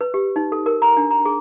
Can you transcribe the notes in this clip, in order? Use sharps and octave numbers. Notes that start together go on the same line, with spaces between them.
B4
G4
D#4
A4
A#4
A#5
D4
A#5
G#4